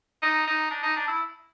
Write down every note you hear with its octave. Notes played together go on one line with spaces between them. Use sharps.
D#4
D#4
D4
D#4
D4
E4